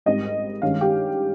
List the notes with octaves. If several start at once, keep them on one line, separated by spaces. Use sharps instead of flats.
G#1 G#2 G3 C4 D#5
G2 D#3 G#3 C#4 F5
G4